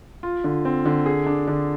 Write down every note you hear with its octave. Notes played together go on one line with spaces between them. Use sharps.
F4
D3
C4
D3
G#4
D4
D3